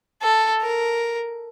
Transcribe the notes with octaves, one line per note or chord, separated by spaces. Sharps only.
A4
A#4